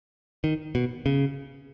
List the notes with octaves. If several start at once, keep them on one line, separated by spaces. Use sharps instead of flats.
D#3
B2
C#3